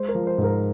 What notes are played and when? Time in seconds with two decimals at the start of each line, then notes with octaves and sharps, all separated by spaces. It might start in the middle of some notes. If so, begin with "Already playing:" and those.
Already playing: G#3 C5
0.09 A#4
0.15 F3
0.27 C5
0.38 G#2
0.44 A#4